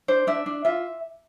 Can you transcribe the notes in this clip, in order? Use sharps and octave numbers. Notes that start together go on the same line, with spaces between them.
D4 C5
D4 E5
D4
F4 E5